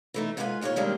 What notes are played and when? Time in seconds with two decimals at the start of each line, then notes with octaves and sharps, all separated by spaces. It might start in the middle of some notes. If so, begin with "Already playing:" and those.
0.14 E3 A3 D#4
0.37 G#2 B3 F4 G4 B4 G#5
0.61 D#2 A#2 D#4 G#4 C#5
0.76 D#3 G3 G#3 A#3 C4 D4